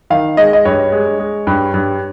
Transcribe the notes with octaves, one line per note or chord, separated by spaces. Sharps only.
D#3 F5
G#3 D#5
D#5
G2 C#5
G#3
G#3
G2
G2